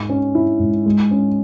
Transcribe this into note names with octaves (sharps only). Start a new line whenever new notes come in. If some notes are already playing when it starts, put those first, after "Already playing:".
Already playing: G#2 G#3
C#4
E4
G#2
G#3
C#4